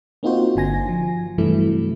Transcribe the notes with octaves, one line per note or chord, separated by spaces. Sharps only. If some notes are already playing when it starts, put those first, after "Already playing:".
A#3 C4 D#4 F4 F#4 C5
G1 D3 G#5 A#6
F3
G2 C3 E3 F#3 A3 E4